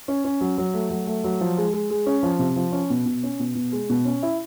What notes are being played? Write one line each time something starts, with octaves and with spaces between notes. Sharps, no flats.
C#4
C#4
F#3
F#3
A3
F#3
A3
F#3
F3
G#3
G#3
G#3
C#4
F3
C3
F3
C#4
B2
B2
C#4
B2
B2
G#3
B2
C#4
E4